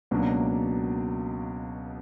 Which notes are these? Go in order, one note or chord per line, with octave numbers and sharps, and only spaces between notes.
C#2 B2 F#3 A#3 D4